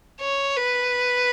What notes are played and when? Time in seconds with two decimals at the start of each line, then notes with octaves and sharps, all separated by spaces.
0.21 C#5
0.57 B4